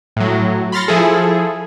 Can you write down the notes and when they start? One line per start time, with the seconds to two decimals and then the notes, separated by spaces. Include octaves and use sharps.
0.16 A2 F#3
0.72 B5 C6 F6 A6 A#6 C#7
0.88 F3 E4 G#4 A4